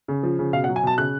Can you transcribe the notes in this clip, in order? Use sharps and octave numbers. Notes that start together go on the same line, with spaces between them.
C#3
F3
C#3
B2 F5
F#5
F#3
G#5
B2 A5
C#3 F#6